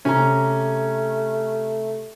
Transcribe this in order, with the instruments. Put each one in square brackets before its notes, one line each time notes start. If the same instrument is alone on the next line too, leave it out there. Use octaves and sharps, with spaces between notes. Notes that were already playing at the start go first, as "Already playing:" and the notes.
[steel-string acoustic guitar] C3 G4 A#5 [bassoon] A3 [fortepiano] C#4